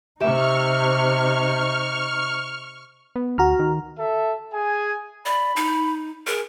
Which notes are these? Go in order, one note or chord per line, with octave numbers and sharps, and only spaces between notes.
C3 D#4 G4 E5 C#6 F6
B3
D2 F#4 A#5 F6
D#3
A4 E5
G#4 G#5
D5 B5
D#4
G#4 A#4